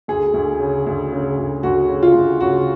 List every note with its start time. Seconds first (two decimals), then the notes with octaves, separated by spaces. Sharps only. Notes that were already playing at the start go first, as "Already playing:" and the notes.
0.08 D2 G#4
0.34 D2
0.60 C#3
0.87 D2
1.12 C#3
1.37 D2
1.63 D2 F#4
1.89 C#3
2.03 F4
2.15 D2
2.41 C#3 F#4